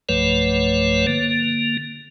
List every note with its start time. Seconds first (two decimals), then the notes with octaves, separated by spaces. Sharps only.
0.09 B1 G2 F3 A3 B4 C#5
1.07 D3 A#3